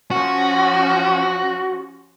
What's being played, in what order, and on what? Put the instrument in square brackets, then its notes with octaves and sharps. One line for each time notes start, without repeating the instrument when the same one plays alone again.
[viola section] F3 C#4 [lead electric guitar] F#4